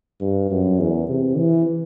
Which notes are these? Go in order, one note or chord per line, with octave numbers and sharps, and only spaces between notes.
G2
F#2
E2
C3
E3